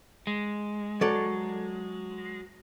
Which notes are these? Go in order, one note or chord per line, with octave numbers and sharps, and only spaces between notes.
G#3
F#3 A4 D5